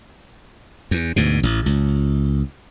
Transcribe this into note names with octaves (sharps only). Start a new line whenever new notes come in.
E2
D2 G#2 B2
A1
C#2